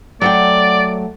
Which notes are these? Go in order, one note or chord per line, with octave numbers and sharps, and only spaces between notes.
F#3 A3 D5 F#5 G5